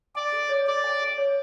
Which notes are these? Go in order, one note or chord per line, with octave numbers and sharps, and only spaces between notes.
D5 G#5
A4
C#5
A4 D5
G#5
A4
C#5